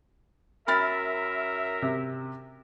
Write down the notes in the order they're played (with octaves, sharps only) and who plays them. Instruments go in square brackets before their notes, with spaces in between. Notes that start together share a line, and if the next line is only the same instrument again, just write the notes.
[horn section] F#2 A#4 E5 [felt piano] B5 F6 A6
[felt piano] C3